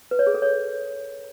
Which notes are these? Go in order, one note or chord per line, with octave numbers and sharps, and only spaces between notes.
B4
C#5
G#4
A4
C#5